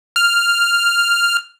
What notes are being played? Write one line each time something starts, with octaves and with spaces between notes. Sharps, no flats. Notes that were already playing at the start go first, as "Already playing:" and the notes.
F6